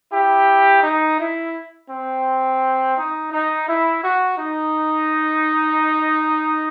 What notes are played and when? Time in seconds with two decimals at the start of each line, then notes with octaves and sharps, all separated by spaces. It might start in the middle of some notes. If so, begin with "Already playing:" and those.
0.12 E4 G4
0.83 D#4
1.19 E4
1.90 C4
2.97 D#4
3.32 D#4
3.68 E4
4.03 F#4
4.38 D#4